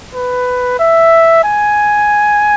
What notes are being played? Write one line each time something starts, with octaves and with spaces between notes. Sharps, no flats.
B4
E5
G#5